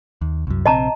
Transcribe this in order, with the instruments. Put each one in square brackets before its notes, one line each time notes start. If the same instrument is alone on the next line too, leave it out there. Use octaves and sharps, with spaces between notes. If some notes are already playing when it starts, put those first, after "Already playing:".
[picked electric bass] D#2
C2 F#2
[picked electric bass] A#1 C3 C4 [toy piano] D#5 A5 A#5